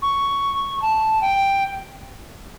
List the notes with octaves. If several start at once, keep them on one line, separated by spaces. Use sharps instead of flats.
C#6
A5
G5